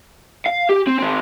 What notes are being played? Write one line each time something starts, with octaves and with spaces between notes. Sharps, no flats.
F5
G4
C4
D#3 C4